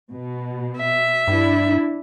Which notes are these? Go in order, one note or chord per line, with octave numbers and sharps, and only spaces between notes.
B2
E5
G2 D4 E4